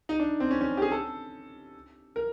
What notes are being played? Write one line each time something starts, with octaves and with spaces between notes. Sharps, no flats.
D#4
D4
C4
C#4
C#4
G4
G#4
A4
A#4